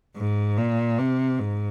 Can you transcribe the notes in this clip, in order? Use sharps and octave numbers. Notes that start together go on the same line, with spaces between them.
G#2
A#2
C3
G#2